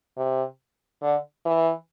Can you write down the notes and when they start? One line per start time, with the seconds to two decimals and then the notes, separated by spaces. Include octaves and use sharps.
0.17 C3
1.02 D3
1.45 E3